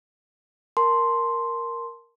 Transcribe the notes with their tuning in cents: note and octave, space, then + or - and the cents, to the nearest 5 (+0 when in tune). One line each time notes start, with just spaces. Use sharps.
A#4 +0 A5 +0 C6 +0